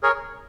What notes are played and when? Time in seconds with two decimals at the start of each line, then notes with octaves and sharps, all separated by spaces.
0.03 G#4 A#4 C#5